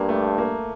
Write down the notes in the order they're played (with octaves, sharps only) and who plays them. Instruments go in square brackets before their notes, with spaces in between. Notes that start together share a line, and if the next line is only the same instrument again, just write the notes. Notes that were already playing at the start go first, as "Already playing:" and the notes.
Already playing: [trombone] G2 [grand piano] A#3
[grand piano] A3
A#3